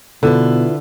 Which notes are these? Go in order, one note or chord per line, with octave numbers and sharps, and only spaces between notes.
B2 D3 E4 F4 B4